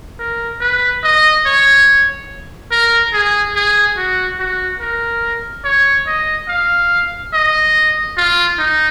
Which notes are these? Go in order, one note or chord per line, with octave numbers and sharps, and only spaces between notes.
A#4
B4
D#5
C#5
A#4
G#4
G#4
F#4
F#4
A#4
C#5
D#5
F5
D#5
F4
D#4